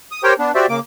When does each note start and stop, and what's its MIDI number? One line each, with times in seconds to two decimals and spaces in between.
0.11 0.23 87
0.23 0.34 67
0.23 0.34 70
0.23 0.34 72
0.23 0.34 73
0.23 0.34 79
0.39 0.52 59
0.39 0.52 62
0.55 0.66 66
0.55 0.66 67
0.55 0.66 72
0.55 0.66 74
0.55 0.66 76
0.69 0.79 49
0.69 0.79 58
0.69 0.79 86